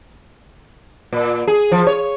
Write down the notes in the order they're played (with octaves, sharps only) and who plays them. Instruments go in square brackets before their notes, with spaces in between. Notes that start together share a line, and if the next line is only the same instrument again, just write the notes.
[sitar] A#2
G#4
F3
C#5